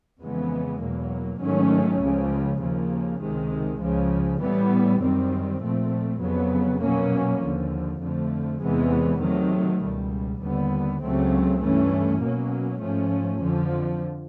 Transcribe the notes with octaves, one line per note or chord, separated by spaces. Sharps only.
F2 C#3 E3 G#3 B3
E2 B2 F#3 A#3
G#2 D#3 F#3 A3 C#4
C#2 C#3 F3
D#2 C#3 F3 A#3
C#2 C3 D#3 G#3
C#2 C#3 F3
A2 E3 G3 B3
F#2 D#3 G3 C4
A#2 F3 A3 C4
F2 C#3 F#3 B3
B2 F#3 A#3 C#4
D#2 D3 F3
F2 D3 F3 A3
E2 C3 E3 G#3 B3
C3 D#3 F#3 A3
C#2 B2 G3
D#2 D3 G3 B3
C#2 C#3 F#3 A3 C4
G2 E3 A3 C#4
B2 F#3 A#3 C#4
G#2 F3 A3 C#4
F2 D3 F3